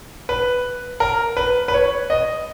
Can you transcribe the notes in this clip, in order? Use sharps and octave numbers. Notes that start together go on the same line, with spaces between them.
B4
A#4
B4
B4
C#5
D#5